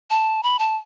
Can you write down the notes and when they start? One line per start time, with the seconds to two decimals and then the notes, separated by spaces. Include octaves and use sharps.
0.10 A5
0.43 B5
0.59 A5